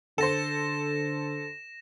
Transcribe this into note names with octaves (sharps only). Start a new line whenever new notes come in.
D3 A4 C5 A#6 E7